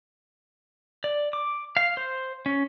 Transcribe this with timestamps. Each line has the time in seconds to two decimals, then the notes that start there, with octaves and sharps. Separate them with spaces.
1.04 D5
1.33 D6
1.77 F5
1.97 C5
2.46 C#4